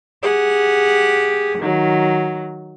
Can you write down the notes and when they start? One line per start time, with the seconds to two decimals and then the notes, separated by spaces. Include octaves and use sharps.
0.22 G4 G#4 F#5
1.59 D#3 F#3